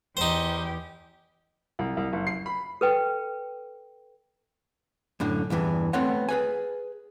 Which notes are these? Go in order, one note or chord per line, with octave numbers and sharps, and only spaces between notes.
E2 D#4 G4 C5
C2
C2
F#1
C7
B5
A4 B4 G5
F#2 A2 D3
E2 G2 E3 B3
A3 B3 C4 C#5 F#5
G#4 B4 G#5